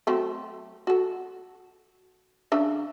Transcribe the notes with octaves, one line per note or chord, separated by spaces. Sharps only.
F#3 A3 C4
F#4 A4
C#3 D4 E5